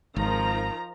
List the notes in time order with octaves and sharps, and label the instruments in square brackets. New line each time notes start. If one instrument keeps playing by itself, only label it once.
[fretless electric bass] G#1 [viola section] D#3 F3 A#5